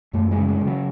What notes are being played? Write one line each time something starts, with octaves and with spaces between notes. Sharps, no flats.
F#2 A3
G#3
C#3
G#3
C#3
F#3